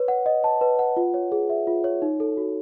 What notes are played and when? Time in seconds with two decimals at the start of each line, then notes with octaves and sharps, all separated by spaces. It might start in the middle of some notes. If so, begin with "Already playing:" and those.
Already playing: B4 C#5
0.08 F#5
0.26 D#5
0.44 A5
0.61 B4
0.79 F#5
0.97 F4
1.14 C#5
1.32 G#4
1.50 E5
1.67 F4
1.84 C#5
2.02 D#4
2.20 A4
2.37 F#4